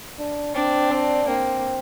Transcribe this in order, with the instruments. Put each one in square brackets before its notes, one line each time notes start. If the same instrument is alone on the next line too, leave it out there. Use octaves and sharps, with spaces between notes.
[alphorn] D4
[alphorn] C4 [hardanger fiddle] D4
[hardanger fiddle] C4 [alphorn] D4
[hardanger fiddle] A#3 [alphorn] C4